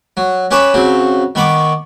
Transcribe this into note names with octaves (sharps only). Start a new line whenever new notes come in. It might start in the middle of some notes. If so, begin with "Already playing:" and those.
F#3
C#4 G4 B4 C#5 A5 B5
C#3 F#3 C4
D#3 B3 B5 C#6 D6